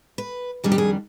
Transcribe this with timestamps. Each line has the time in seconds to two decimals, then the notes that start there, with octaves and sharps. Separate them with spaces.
0.18 B4
0.64 F2 D#3 G3 D4 G#4
0.72 G4
0.78 G#4